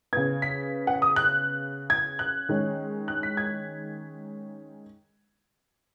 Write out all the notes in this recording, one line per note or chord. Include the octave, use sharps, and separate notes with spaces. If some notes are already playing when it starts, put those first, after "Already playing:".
C#3 B3 G#6
B6
F#5
D#6
F#6
G#6
F#6
D#3 G#3 C#4
F#6
B6
G#6